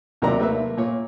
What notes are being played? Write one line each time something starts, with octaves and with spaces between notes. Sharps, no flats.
D#2 C3 F#3 A#4 D5 A#5
A3 A#3 B4 E5
A#2 C#5